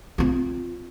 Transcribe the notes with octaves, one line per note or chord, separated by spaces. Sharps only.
C4 F4